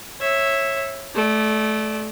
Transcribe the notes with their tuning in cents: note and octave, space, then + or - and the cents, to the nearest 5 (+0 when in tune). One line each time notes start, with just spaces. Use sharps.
C#5 -20 E5 +0
A3 -20 D5 +0